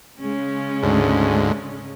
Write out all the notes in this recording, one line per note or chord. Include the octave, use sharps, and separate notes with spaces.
C#3 G#3 C#4
D2 G#2